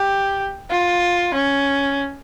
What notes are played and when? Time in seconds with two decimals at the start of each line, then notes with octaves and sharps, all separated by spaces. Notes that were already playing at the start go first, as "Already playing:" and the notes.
Already playing: G4
0.70 F4
1.34 C#4